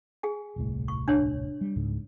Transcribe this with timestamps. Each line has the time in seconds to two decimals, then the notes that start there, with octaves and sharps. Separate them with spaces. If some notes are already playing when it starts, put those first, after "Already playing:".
0.23 G#4 G#5
0.56 D#1 C2 A2
0.88 C#6
1.08 D4 C#5
1.61 G3
1.76 C#2 G#2 C#3